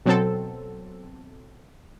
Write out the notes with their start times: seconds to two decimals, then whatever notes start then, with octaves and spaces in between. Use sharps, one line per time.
0.05 B2 F#3 C4 A4